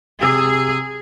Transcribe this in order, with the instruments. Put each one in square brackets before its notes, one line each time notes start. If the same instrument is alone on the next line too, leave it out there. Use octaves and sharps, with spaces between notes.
[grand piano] C3 [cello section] G#4 [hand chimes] E6